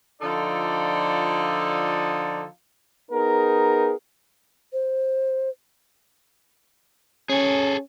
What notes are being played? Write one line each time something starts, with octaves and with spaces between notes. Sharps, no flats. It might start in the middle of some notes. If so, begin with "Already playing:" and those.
D3 F3 D#4 F4 A4 D5
B3 D#4 G#4 A#4
C5
C#4 G#4 A4